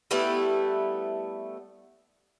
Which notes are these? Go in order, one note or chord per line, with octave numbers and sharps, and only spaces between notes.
G3 A3 B3 E4